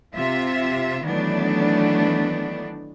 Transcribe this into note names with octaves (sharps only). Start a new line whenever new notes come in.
C3 F4 E5
D#3 E3 F#3 A3 B3 D4